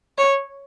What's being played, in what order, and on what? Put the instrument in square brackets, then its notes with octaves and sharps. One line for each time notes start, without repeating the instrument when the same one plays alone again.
[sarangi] C#5